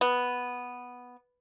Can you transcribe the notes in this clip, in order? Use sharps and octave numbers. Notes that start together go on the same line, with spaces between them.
B3